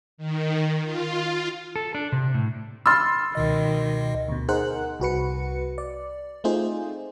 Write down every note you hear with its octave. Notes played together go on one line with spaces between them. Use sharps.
D#3
F4
A4
D4
C3
A2
B5 C6 E6 F6 A6
C#2 B2 D#3 D#5
D2 B2
D#4 G#4 A#4 C5 F#5 F#6
C2 F#4 B4 C#7
D5
A3 C4 D#4 F4 G#4 C5